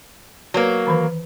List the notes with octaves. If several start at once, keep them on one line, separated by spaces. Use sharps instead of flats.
F#3 A#3 B4 D5
D#3 E3 B4